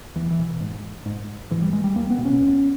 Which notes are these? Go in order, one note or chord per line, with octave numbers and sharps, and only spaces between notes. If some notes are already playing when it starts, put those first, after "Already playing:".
E2 E3
E3
B2
G#2
G#2
G#2 E3
G3
G#3
G3
E2 A#3
B3
B2
C#4
E2